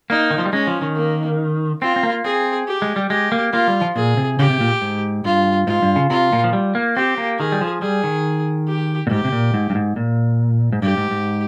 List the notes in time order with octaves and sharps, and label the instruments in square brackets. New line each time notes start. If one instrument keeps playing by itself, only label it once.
[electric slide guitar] A#3 [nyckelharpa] D#4
[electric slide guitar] D#3
F3
G3
[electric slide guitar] G#3 [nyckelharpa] C#4
[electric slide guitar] F3
D#3
[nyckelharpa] A#3
[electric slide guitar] C4 [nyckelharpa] F4
[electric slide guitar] C4
A#3
[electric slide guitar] C4 [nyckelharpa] G#4
[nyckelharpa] G4
[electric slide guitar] G#3
G3
[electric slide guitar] G#3 [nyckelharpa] G4
[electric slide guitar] A#3
[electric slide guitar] A#3 [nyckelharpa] F4
[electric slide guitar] G3
F3
[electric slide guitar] A#2 [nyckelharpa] G#4
[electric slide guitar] C3
[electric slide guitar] C#3 [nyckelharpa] G4
[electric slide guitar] C3
A#2
G#2
[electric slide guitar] G2 [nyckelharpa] F4
[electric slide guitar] G#2 [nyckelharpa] F4
[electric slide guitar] G2
C#3
[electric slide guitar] C3 [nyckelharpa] F4
[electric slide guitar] A#2
F3
G3
A#3
[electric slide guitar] C4 [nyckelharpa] G4
[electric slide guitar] A#3
[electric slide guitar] D#3 [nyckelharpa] G#4
[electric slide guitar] G3
F3
[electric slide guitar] G3 [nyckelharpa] G#4
[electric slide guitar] D#3
[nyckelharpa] G4
[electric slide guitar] A#2
[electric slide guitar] G#2 [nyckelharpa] G4
[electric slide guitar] C3
A#2
G#2
G2
G#2
A#2
G#2
[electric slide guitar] G2 [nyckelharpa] G4
[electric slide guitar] G#2
G#2